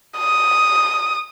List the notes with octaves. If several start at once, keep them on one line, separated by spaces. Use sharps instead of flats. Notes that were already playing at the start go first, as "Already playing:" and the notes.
D#6